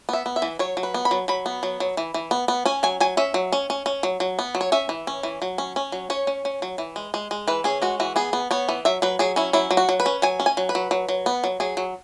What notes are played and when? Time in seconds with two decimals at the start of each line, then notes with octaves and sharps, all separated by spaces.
0.09 B3 E5
0.26 B3
0.36 E5
0.42 E3
0.59 F#3 C#5
0.77 F#3
0.83 B4
0.94 B3
1.05 B5
1.11 F#3
1.28 F#3 B5
1.46 B3
1.63 F#3
1.80 F#3
1.97 E3
2.14 E3
2.31 B3
2.48 B3
2.65 C#4 G#5
2.83 F#3 G#5
3.00 F#3 G#5
3.17 C#4 E5
3.34 F#3
3.52 C#4
3.70 C#4
3.86 C#4
4.03 F#3
4.20 F#3
4.39 B3
4.55 F#3
4.61 C#5
4.72 C#4 E5
4.89 E3
5.07 C#4
5.23 E3
5.42 F#3
5.58 C#4
5.76 C#4
5.92 F#3
6.10 C#4 C#5
6.27 C#4
6.45 C#4
6.62 F#3
6.78 E3
6.96 G#3
7.14 G#3
7.31 G#3
7.48 E3 B4
7.64 C#4 G#4
7.82 G#3 F#4
8.00 E3 F#4
8.16 B3 G#4
8.33 B3
8.51 B3 C#5
8.69 E3
8.85 F#3 E5
9.02 F#3 B4
9.19 F#3 G#4
9.36 C#4 E4
9.53 F#3 E4
9.71 F#3
9.77 F#4
9.89 F#3
10.00 B4
10.06 C#4
10.22 F#3 G#5
10.40 C#4
10.46 G#5
10.57 F#3
10.69 B4
10.75 F#3
10.91 F#3
11.09 F#3
11.26 B3
11.44 F#3
11.60 F#3 G#4
11.77 F#3